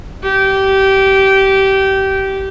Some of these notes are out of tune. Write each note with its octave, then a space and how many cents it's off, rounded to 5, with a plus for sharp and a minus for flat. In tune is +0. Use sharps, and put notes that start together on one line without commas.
G4 -20